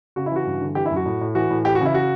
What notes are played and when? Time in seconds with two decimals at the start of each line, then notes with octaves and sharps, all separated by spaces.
0.16 C#3 F#4
0.26 E4
0.32 E3 F#4
0.46 G2
0.61 D3
0.75 E3 G4
0.86 E4
0.91 F#2
0.96 F#4
1.06 A2
1.21 A2
1.35 E3 F#4
1.50 A2
1.65 E3 G4
1.75 F#4
1.80 C#3 E4
1.94 F#4